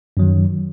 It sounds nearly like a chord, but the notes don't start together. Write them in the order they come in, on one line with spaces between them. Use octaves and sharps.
F#2 F#3 D#3